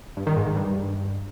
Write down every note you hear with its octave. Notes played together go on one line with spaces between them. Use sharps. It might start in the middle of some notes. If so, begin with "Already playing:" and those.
G2
D#3
G#2
D#3
G2